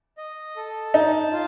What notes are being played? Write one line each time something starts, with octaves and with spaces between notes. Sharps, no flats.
D#5
A4
D#4 A5
F4